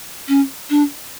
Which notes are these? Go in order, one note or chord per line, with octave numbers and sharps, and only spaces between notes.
C#4
D4